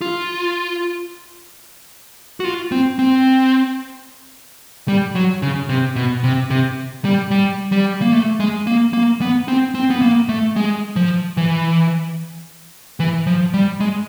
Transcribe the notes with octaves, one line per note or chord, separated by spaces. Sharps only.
F4
F#4
F4
C4
C4
G3
F#3
C#3
C3
B2
C3
C3
G3
G3
G3
A#3
A3
G#3
A#3
A#3
B3
C4
C4
B3
A#3
A3
G#3
F3
E3
E3
F3
G3
G#3